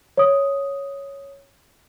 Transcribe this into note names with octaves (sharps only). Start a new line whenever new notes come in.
C#5 D#6